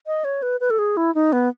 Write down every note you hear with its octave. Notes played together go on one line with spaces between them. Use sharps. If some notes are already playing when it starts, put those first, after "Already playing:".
D#5
C#5
B4
B4
A4
G#4
E4
D#4
B3